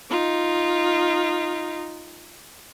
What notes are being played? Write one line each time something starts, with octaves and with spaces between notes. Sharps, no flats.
D#4 F4